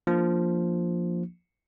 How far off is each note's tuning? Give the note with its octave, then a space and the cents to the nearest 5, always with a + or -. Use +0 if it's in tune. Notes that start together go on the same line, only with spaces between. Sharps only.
F3 +0 A#3 +0 D4 +15